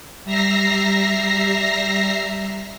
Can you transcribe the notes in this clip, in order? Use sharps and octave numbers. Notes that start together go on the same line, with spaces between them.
G3 E5 A#5 A#6 C7